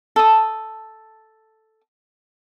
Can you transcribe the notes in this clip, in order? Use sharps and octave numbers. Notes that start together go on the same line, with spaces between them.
A4 D#6